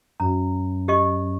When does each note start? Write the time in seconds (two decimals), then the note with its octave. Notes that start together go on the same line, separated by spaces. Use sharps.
0.20 F#2 A#5
0.88 G4 D#5 C#6